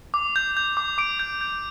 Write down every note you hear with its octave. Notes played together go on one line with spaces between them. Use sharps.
D6
G6
G6
D6
D6 D7
G6
G6